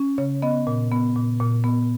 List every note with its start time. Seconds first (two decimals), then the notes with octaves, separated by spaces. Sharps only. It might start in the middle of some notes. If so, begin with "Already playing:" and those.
Already playing: C#4
0.18 C#3 C#5
0.42 B3 D#5
0.67 A#2
0.91 B3
1.16 A#2
1.40 A#2
1.64 B3